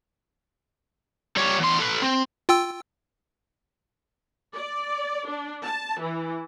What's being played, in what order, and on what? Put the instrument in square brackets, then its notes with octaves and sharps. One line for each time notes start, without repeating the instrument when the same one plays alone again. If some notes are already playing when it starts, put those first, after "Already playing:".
[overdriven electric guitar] G3 C#5
E2 C6
A4 B4
C4
[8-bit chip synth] F4 G5 E6
[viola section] D5
D4
A5
E3